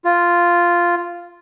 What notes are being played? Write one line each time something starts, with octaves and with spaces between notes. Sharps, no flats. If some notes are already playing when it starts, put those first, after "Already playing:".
F4